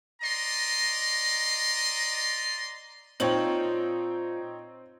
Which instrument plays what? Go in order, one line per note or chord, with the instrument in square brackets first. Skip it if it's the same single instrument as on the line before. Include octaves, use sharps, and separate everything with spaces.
[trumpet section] D5 D#5 A#5 C6
[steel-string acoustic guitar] A#2 F4 A5 [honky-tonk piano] C4 F#7 [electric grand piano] D#4 C#5 G5